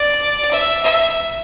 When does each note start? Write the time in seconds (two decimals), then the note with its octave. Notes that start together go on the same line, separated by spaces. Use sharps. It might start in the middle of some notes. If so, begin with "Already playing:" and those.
Already playing: D5
0.51 E5
0.82 E5